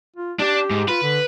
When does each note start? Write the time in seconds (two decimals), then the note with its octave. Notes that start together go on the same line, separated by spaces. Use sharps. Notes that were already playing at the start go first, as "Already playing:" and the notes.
0.16 F4
0.40 D4 G4
0.71 G#2
0.89 F4 B4
1.03 D3